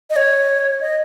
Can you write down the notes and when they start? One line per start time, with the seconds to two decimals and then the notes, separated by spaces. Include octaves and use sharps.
0.10 D#5
0.16 C#5
0.81 D#5